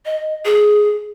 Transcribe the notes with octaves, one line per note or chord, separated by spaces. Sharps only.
D#5
G#4